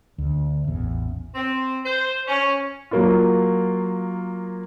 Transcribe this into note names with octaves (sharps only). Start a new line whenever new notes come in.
D2
A1 E2
C4
C5
C#4
F#3 A#3 F4